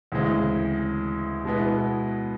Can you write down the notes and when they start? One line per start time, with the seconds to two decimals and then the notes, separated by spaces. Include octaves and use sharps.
0.12 D2 C#3 E3 G#3 C4
1.45 B2 G#3 B3 E4